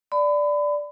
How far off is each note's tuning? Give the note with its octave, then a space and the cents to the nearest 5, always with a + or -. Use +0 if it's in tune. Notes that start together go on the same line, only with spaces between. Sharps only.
D5 +0 B5 +30